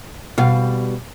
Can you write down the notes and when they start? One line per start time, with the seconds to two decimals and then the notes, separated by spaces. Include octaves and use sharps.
0.38 B2 G3 F5